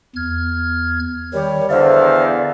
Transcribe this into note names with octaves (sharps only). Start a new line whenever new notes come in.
E2 F6 G#6
D#3 G3 C#5
E2 D3 C5 D5 E5 F5